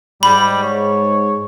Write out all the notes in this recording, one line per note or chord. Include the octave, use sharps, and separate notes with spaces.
G#2 G3 B5
C#5